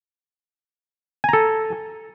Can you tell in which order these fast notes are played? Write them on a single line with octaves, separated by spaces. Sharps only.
G#5 A#5 A4